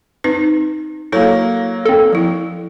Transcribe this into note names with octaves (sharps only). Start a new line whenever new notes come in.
C4 D#4 B4
F#3 A#3 E4 A4
C4 A4
F3 E4